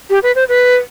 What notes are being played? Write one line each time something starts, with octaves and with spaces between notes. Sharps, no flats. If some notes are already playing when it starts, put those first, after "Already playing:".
G4
B4
C5
B4